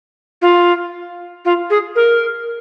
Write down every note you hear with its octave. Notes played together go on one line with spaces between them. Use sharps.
F4
F4
G#4
A#4